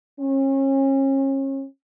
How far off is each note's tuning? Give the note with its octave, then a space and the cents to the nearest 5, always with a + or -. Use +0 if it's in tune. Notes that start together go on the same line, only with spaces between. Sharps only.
C#4 -35